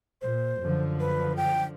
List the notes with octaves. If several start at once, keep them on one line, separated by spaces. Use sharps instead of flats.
A#2 C5
F#2 D3 F3
B4
G5